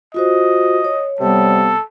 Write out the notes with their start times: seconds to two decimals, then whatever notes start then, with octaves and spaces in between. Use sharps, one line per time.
0.14 F4 F#4 C5 D#5
0.84 C#5
1.20 C3 G3 B3 A4